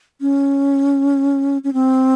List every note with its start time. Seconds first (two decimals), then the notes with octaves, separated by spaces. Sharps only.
0.21 C#4
1.64 C#4
1.73 C4